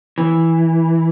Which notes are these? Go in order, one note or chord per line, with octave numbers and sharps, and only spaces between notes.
E3